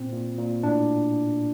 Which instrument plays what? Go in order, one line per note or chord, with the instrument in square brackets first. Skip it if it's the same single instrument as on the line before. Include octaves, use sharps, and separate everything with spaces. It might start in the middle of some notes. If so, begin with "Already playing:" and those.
Already playing: [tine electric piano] A#2 C4
A#2
A#2
A2 D4